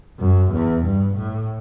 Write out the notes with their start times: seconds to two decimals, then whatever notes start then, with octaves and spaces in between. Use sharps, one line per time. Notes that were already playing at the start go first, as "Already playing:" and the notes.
0.19 F#2
0.52 E2
0.84 G2
1.17 A2